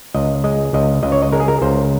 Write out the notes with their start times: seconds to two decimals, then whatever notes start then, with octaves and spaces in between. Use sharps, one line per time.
0.14 C#2 D#5
0.44 G#3 D#5
0.73 C#2 D#5
1.03 C#2 D#5
1.12 C#5
1.22 D#5
1.32 G#3 A#4
1.40 G#4
1.48 A#4
1.62 C#2 C5